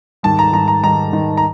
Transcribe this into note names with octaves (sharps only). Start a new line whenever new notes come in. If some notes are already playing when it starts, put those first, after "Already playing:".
G#2 D#3 G3 A5
A#5
G#2 D#3 G3 A#5
A#5
G#2 D#3 G3 A#5
G#2 D#3 G3
A#5